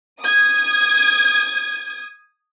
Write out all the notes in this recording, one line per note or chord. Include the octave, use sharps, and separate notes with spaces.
D#6 G#6